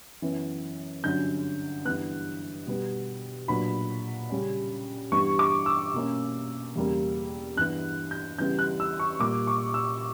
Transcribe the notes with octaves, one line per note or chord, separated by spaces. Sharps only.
F#2 E3 B3
G2 D3 F#3 C#4 G6
G2 E3 B3 F#6
B2 G3 B3
A#2 F#3 B3 D4 B5
C#3 G3 C#4
G2 E3 G3 B3 C#6
D6
E6
B2 A#3 C#4
E2 C#3 G3 A#3
G2 E3 B3 F#6
G6
C#3 E3 G3 B3 G6
F#6
E6
C#6
A#2 G3 A#3 D6
C#6
E6